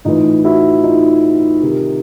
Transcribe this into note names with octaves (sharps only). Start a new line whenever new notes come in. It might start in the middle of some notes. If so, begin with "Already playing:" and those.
A2 E3 D#4 F4
E4 F#4
D#4 F4
C3 D#3